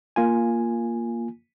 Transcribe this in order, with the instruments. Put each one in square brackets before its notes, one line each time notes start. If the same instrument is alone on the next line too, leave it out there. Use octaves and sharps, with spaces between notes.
[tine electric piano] A#3 F4 G#5